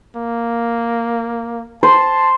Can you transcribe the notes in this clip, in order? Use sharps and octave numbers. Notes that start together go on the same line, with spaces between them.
A#3
C5 A5